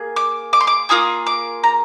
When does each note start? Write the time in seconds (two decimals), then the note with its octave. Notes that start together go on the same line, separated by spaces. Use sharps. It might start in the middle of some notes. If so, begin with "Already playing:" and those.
Already playing: A#3 G#4
0.16 D6
0.53 D6
0.61 C6
0.67 D6
0.89 A#3 F4 G#4 D#6
1.27 D6
1.64 A#5